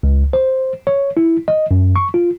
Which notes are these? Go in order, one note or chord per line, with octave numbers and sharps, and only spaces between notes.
C#2
C5
C#5
E4
D#5
F#2
C#6
F4